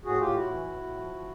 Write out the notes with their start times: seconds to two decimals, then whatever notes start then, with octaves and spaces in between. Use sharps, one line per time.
0.05 A2 F#4 G#4
0.19 A2 F4 G4
0.35 A2 E4 F#4
0.51 E3
0.66 A2
0.82 A2
0.98 F3
1.14 F3